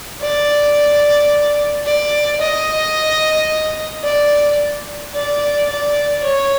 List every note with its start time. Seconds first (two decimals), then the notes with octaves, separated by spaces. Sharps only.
0.21 D5
1.85 D5
2.41 D#5
4.04 D5
5.15 D5
5.69 D5
6.24 C#5